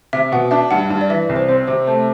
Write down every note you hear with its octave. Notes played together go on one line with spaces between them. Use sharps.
C3 E5
B2 F#5
D4 E5
G2 F#5
G2
D5
E3 E5
D5
C2
C5
C4 C5
C3 C5
A3 C5